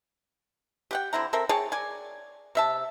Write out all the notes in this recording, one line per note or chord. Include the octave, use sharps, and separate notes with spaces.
G4 F#5 G5
D3 C4 E4 A#5
C4 A4 A#4 E5
G#4 C#5 G5 A5
D5 G#5
C3 E5 A5